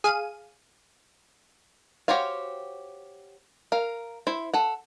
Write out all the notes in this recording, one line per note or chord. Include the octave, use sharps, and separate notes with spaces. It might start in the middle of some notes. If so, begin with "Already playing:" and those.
G#4 F5 D#7
F#4 G4 C5 C#5 F5
A#4 F5
E4 C5
A4 F#5